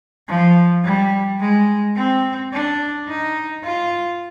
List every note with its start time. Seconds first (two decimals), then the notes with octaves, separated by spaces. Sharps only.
0.28 F3
0.85 G3
1.40 G#3
1.96 C4
2.53 D4
3.08 D#4
3.64 F4